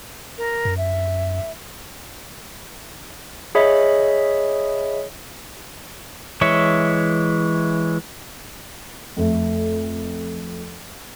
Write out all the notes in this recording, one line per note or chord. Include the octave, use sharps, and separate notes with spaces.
A#4
F#2
E5
G#4 C#5 D#5 E5 B5
E3 G#3 C#5 E5
F2 A3